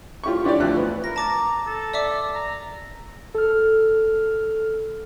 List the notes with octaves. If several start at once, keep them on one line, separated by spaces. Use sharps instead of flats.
F4 G4 C#6
E3 D4 G4 C#5 D5
D2 F3 F#6
B3
A#4 A#6
A5 A#5 D6 A6
A4
D5 E5 D6
A#5
A4 F6